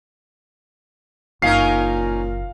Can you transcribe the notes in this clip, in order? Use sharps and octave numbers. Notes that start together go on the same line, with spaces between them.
F#1 A#2 C#4 D#4 A#4 F5 C7